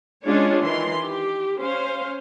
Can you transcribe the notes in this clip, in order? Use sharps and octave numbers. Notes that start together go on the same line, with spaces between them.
G#3 C#4 D4 F4 C#5
D#3 E3 C6
G4
C#4 C5 F5